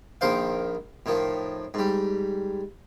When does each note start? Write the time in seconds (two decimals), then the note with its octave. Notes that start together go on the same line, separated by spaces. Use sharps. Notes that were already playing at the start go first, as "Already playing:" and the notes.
0.21 A#1 D#3 A#4 C5 F5
1.06 A2 D#3 F3
1.74 G#2 G3